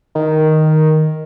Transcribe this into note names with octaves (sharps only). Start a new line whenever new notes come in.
D#3